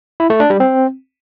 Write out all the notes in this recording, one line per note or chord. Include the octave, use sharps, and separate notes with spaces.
E4
A3
D4
G3
C4